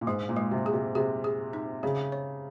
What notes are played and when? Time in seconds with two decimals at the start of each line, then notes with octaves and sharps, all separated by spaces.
0.01 A#2
0.07 G#2 G#3
0.29 A#2
0.36 G#3
0.51 C3
0.66 G#4
0.73 C3
0.95 C3 G#4
1.24 G#4
1.53 D#4
1.83 C#3 G#4
2.12 C#5